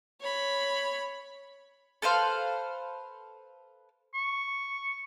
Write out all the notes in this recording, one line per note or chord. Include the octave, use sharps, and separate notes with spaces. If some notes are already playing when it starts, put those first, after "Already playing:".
C#5 B5
A4 B4 C5 F5
C#6